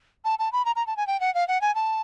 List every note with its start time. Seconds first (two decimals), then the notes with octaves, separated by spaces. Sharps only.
0.25 A5
0.39 A5
0.52 B5
0.65 A#5
0.76 A#5
0.87 A5
0.97 G#5
1.07 G5
1.20 F#5
1.34 F5
1.48 F#5
1.61 G#5
1.75 A5